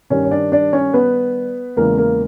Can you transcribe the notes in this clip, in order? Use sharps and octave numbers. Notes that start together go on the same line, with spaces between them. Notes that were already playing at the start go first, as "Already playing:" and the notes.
G2 D#3 G3 C#4 C#5
C#5
D4 D5
D4 D5
C#4 C#5
B3 B4
E2 C#3 E3 G#3 A#3 A#4
A#3 A#4